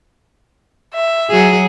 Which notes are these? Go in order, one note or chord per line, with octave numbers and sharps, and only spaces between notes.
E5
F#3 G#4